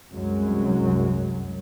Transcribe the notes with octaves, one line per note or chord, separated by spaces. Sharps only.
C2 F#2 F#3 G#3